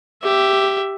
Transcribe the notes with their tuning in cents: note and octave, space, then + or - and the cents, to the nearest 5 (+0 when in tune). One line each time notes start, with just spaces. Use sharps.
G4 -5 E5 +5